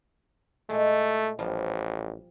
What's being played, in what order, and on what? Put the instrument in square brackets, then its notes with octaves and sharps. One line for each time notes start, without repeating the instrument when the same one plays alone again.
[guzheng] A#2 G#3 [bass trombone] A3
[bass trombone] A1 [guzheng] F3 G3